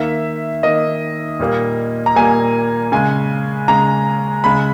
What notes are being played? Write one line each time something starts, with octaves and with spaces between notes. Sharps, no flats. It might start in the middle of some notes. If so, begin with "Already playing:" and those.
Already playing: D#3 A#3 E5
D#3 A#3 D#5
A#2 G3 A#3
A#5
A#2 G3 A#3 G#5
C#3 G#3 G#5
C#3 G#3 A#5
C#3 G#3 B5